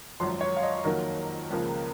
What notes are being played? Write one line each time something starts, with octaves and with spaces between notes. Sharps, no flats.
G#1 F#2 F3 C6
C#5
F5
D#5
F2 D#3 F#3 A#3 A#4
C#2 C#3 F3 A#3